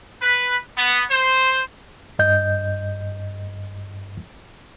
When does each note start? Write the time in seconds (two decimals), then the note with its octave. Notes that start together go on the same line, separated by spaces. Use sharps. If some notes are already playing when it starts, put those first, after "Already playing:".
0.21 B4
0.77 B3
1.10 C5
2.19 G2 D#5 G6